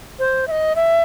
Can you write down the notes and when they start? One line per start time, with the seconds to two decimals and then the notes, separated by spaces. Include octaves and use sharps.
0.19 C5
0.48 E5
0.51 D#5
0.76 E5